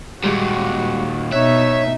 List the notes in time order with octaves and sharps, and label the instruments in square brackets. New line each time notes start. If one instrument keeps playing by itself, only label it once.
[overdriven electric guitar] D#2 A#2 [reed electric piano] G3 G#3 G4 [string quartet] F#4
[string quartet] B2 D#4 [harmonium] C#5 [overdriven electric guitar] E5 [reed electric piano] F#6